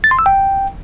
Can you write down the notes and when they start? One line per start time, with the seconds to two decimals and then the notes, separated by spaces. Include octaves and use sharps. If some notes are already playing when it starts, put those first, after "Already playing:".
0.04 A6
0.11 C6
0.19 E6
0.26 G5